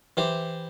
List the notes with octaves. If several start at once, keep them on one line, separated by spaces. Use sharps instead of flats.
E3 G4 C5